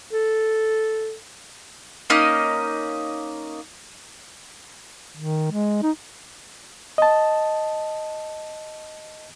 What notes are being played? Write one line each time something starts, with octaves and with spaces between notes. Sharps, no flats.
A4
A#3 C#4 D#4 D#5
D#3
G#3
D#4
D#5 A5